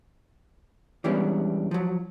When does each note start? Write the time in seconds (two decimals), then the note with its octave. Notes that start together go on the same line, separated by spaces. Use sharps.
1.04 E3 G3 G#3 B3 C#4 D4
1.71 F3 F#3